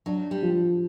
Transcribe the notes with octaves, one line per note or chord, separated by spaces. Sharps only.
F#3 D4
G3
F3